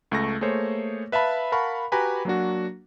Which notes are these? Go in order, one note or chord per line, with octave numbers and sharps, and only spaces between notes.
C#2 A3 C#6 A#6
A3 A#3 G#4 C5 C#5
B4 E5 F5 A5 B5
A#4 F5 F#5 A5 B5 C#6
F#4 G4 B4 G#5 A#5 B5
F#3 A#3 D4 F#4